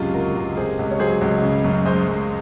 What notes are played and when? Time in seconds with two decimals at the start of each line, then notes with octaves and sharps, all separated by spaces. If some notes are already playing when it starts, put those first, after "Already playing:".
Already playing: C#2 F#2 C3 F4 G#4
0.14 F#3 F#4 A#4
0.36 C#2
0.57 C3 G#4 C5
0.79 C#2
0.91 C#5
0.99 F#3 G#4 C5
1.21 C#2
1.42 C#3
1.64 F#2
1.85 G#3 C5 D#5
2.07 F#2